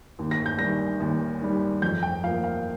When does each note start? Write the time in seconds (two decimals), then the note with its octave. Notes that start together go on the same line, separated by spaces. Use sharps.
0.19 D#2
0.31 A#6
0.46 G6
0.59 D#3 G3 A#6
1.00 D#2
1.42 D#3 G3
1.82 F2 G6
2.03 G5
2.24 F3 A#3 F5
2.44 F5